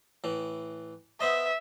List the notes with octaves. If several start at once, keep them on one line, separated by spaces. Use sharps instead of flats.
A2 E3
B3 C5 D#5 E5